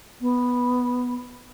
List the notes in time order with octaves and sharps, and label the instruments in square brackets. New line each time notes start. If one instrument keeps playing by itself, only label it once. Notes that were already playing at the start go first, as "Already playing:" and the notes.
[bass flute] B3